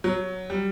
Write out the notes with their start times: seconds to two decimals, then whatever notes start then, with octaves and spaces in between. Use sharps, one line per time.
0.04 F#3
0.50 G3